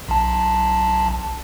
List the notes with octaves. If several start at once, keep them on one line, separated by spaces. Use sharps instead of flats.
B1 A5